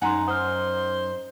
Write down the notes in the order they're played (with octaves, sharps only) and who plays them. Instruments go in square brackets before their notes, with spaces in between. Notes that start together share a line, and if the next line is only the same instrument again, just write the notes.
[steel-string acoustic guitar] F#2 D#4 [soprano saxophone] F#5 [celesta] G#5 A#5 C6
[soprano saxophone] C5 [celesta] D#6 F6